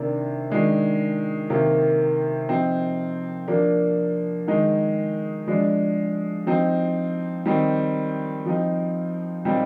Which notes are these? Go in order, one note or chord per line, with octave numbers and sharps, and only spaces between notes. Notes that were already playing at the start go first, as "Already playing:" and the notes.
Already playing: C3 D#3 A#3 D4
D#3 G#3 D4
C3 D#3 A#3
F3 C4 D#4
F3 A#3 D4
D#3 G#3 D#4
F3 G#3 D4
F3 C4 D#4
D#3 G3 C4 D#4
F3 C4 D#4
A#2 G3 C4 D#4